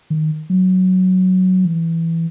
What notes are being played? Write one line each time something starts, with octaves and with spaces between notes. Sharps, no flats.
D#3
F#3
E3